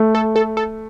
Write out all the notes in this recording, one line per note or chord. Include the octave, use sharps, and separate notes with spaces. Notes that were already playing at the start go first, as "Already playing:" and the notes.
Already playing: A3
A4
A4
A4